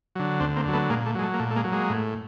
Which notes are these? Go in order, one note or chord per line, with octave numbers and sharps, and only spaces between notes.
D3 F#3
D2 C4 D4
A#3 C4
D3 F#3
A3 B3
A#2 G#3 A#3
A3
F#3 G#3
A3
A#3
A#2 A3
A3
G#3 A#3
F#3
G#3 A#3
A2